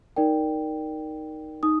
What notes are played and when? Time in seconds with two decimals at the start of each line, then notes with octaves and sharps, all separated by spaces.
0.16 D#4 A#4 D5 G5
1.63 D#4 D#6